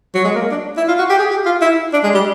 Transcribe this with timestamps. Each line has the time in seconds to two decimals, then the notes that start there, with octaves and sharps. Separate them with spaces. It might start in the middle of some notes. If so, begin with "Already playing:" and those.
0.14 F#3
0.25 G#3
0.35 A#3
0.51 D4
0.77 E4
0.88 F4
0.99 F#4
1.09 G4
1.19 G#4
1.30 G4
1.45 F4
1.61 E4
1.93 D4
2.03 G#3
2.14 G3